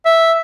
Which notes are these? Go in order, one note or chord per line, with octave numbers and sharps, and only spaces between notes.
E5